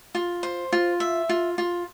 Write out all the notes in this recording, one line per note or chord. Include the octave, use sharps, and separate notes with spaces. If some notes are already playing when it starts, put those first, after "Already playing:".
F4
C5
F4
E5
F4
F4